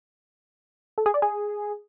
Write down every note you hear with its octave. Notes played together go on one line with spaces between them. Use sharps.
A4
G#4
D5
G#4